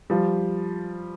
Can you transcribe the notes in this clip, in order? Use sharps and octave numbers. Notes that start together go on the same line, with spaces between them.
F3 G3